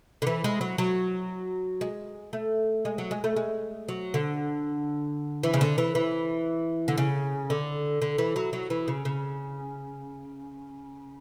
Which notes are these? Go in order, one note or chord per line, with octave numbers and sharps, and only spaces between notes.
D3
E3
G#3
F#3
F#3
G#3
A3
G#3
F#3
G#3
A3
G#3
F#3
D3
E3
C#3
D3
E3
E3
D3
C#3
D3
D3
E3
F#3
F#3
E3
C#3
C#3